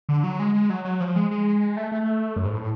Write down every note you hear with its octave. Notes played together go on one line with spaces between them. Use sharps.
D3
F#3
G#3
G#3
F#3
F#3
F3
G#3
G#3
A3
A3
F#2
G#2
A2